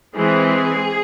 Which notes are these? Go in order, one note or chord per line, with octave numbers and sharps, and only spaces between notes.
E3 G#3 C4 G#4